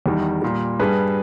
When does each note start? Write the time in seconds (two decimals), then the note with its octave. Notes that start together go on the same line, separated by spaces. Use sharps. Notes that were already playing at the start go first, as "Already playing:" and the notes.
0.06 E2 D#3 G3
0.42 A#2 G3
0.80 G2 G3 G#4 B4